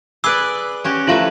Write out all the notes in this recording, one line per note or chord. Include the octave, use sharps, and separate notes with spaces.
G#4 B4 D5 B5 D6 E6
C#4 F#4 G4
F3 A3 E4 F4 B4 F5